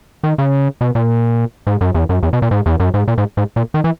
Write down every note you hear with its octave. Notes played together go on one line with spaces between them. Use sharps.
D#3
C#3
B2
A#2
G#2
F#2
E2
F#2
E2
B2
A#2
G#2
E2
F#2
G#2
A#2
G#2
G#2
A#2
D#3
E3